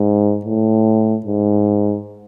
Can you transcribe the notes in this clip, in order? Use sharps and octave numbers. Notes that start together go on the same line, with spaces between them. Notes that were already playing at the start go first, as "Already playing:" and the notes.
Already playing: G#2
A2
G#2